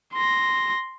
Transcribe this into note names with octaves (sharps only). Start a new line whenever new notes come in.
C6 A#6